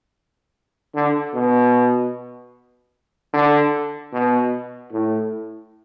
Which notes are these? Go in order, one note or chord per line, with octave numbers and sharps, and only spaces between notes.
D3
B2
D3
B2
A2